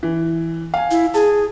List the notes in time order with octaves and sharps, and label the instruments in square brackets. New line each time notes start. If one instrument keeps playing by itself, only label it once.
[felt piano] E3
F5 G#5
[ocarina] E4
[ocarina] G#4 [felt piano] A5